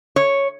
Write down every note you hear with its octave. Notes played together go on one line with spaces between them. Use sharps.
C#5